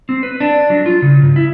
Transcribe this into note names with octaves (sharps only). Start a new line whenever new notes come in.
C4
B4
D4
F#3
F4
C#3
G#2
E4